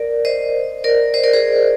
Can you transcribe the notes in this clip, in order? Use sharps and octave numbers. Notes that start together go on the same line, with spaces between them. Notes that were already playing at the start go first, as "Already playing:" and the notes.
Already playing: A#4 D5
C5 D#5
A#4 D5
C5 D#5
A#4 D5
G#4 C5